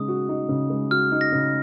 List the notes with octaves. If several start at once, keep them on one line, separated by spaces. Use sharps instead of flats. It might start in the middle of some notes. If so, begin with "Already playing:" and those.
Already playing: C#3 G#3 D#4 D#6
F#4
D#4
C#3
G#3
F#4 F6
D#4
A#6
C#3